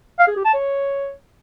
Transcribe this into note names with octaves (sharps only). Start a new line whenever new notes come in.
F5
G#4
G4
A5
C#5